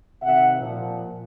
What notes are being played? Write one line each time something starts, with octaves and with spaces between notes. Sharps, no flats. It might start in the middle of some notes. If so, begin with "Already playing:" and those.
C3 D#3 E5 F#5
A#2 F3